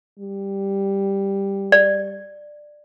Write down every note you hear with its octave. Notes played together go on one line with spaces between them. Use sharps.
G3
D5